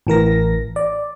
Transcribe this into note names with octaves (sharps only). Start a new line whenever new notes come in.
A1 E3 A#4 A#6
D5